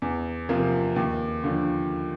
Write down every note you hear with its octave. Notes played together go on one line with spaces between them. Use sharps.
E2
C3 F3 A#3
D#2
D3 F3